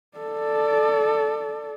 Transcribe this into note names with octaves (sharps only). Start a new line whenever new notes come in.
A4 D5